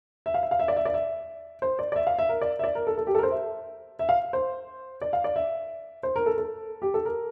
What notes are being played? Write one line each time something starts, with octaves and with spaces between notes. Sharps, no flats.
E5
F5
E5
F5
E5
D5
E5
D5
E5
C5
D5
D5
E5
F5
E5
A#4
D5
E5
D5
A#4
A4
A4
G4
A4
A#4
C5
E5
E5
F5
C5
D5
F5
D5
E5
C5
A#4
A4
A4
G4
A4
A#4